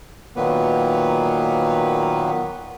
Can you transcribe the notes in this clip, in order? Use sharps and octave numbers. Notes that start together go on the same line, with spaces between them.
A#2 D#3 F#3 A#3 B3 B4